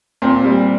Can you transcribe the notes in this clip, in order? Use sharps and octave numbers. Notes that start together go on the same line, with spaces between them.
A#2 C4
G3